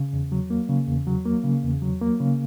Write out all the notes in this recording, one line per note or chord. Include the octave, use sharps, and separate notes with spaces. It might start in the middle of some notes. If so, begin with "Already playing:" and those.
Already playing: C#3
E2
F#3
A#3
C#3
E2
F#3
A#3
C#3
E2
F#3
A#3
C#3